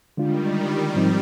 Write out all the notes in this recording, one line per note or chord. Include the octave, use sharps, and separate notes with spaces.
D3 D#3 G3 G#3 D4 F4
G#2 F3 C4 D#4